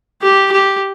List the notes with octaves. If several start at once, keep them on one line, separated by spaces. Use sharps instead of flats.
G4
G4